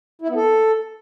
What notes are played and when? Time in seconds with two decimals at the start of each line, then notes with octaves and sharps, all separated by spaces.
0.22 E4
0.28 B3
0.35 A4